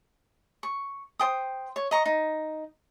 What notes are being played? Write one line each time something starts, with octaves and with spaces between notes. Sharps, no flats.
C#6
C5 G5 D#6
C#5
D#5 A#5 C#6
D#4